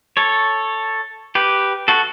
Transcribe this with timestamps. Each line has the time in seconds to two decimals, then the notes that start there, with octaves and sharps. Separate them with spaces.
0.17 A4 C#5
1.35 G4 B4
1.88 F#4 A4